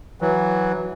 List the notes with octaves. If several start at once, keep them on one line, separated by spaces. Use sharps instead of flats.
E3 F#3